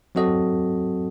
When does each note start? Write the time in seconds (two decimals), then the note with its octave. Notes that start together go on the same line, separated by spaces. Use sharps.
0.15 F#3 C4 F#4 A4 D#5